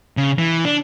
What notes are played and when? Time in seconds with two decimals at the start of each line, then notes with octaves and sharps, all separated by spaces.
0.17 C#3
0.38 E3
0.65 D4